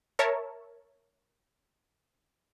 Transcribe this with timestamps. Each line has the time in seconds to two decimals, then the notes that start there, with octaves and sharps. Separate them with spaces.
0.19 A#4 C#5 E5 A5